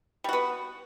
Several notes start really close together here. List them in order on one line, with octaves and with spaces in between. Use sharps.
G3 F#4 B3